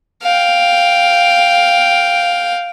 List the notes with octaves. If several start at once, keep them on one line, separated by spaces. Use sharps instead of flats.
F5 G5